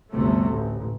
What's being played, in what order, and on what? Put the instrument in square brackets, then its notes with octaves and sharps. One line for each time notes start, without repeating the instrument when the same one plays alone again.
[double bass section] G1 D2 C3 A3
A1